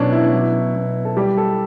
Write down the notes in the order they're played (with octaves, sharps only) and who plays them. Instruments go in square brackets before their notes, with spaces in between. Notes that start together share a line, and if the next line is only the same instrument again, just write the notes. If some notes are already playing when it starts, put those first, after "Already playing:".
Already playing: [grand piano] B2 F#3 C#4 D4
E4
F#3
B2
A4
G3 G4
A4